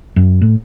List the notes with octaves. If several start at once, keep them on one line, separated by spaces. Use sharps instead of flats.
F#2
A2